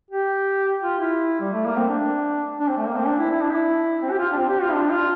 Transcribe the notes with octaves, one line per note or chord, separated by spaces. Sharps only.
G4
F4
E4
G3
A3
A#3
C4
D4
D4
C4
A3
A#3
C4
D4
E4
E4
D4
E4
C4
G4
F4
D4
C4
G4
F4
D4
F4